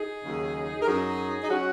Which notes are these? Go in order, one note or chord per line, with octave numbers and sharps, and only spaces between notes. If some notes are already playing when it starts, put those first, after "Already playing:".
Already playing: D#4 G#4
D#2 C#3 F#3
A#4
F#2 F#3 D#4 G#4
D#4
F#3 C#4 F#4